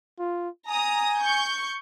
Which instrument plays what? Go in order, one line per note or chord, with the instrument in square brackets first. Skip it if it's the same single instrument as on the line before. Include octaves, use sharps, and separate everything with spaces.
[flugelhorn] F4
[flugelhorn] G#5 [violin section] A#5 D#6
[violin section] C#6 G6